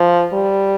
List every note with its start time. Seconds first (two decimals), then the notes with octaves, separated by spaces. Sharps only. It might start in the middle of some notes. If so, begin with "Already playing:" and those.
Already playing: F3
0.33 G3